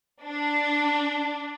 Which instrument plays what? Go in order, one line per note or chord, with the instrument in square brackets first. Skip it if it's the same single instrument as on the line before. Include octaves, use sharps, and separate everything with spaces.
[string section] D4